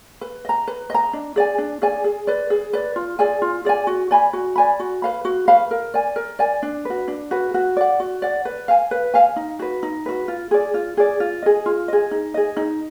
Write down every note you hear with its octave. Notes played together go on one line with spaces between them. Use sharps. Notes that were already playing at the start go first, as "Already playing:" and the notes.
B4
D#5 A#5
B4
D#5 A#5
D4
G#4 D5 G#5
D4
G#4 D5 G#5
G#4
B4 D5
G#4
B4 D5
F4
G#4 D5 G#5
F4
G#4 D5 G#5
F#4
D5 G#5 B5
F#4
D5 G#5 B5
F#4
B4 F5 B5
F#4
B4 F5 B5
A#4
D5 G#5
A#4
D5 G#5
D4
F#4 B4
D4
F#4 B4
F#4
D5 F#5
F#4
D5 F#5
B4
F5 G#5
B4
F5 G#5
D#4
F#4 B4
D#4
F#4 B4
F4
G#4 D5
F4
G#4 D5
F4
G#4 D#5
F4
G#4 D#5
D#4
G#4 D#5
D#4